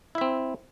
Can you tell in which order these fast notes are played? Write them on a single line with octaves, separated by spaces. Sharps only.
E4 E5 C4